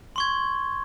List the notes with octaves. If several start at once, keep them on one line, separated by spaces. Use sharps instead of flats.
C6 C#6 G#6